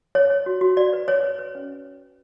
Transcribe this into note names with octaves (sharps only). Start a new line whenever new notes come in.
C#5
C#5
F#4
F#4
F#4 D5
B4
B4 C#5
B4
B4
C#4